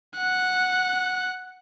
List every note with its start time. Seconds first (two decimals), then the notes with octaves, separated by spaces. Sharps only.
0.15 F#5 F#6